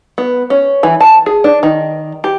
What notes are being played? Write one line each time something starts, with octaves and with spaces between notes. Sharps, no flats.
B3
C#4
E3
A5
G#4
D4
D#3
G4